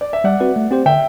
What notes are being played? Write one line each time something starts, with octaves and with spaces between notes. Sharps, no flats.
D5
E5
G3 D5 F#5
C4 F#4 B4
A3
C4 G4 C5
D3 E5 G5